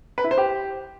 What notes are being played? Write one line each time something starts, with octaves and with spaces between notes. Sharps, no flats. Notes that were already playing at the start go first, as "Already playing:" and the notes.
B4
E4
C5
G4